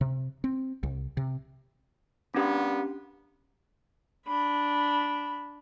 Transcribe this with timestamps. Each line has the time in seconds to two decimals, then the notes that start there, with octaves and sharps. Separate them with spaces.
0.01 C3
0.44 C4
0.83 C2
1.17 C3
2.34 G3 A#3 B3 C#4 D4 G4
4.27 D4 B5